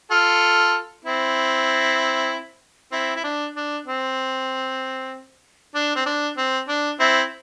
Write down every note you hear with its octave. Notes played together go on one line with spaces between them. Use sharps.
F4 A4
C4 E4
C4 E4
E4
D4
D4
C4
D4
C4
D4
C4
D4
C4 E4